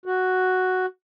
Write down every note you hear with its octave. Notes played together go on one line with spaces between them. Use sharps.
F#4